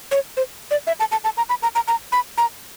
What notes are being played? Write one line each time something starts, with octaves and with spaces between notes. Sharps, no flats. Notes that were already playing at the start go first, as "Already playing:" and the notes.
C#5
C5
D5
E5
A5
A5
A5
A#5
B5
A#5
A#5
A#5
B5
A#5